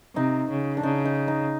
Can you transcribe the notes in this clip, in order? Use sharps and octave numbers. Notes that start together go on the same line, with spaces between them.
C3 D#4
C#3
D4
C#3 D#4
D#4
D#4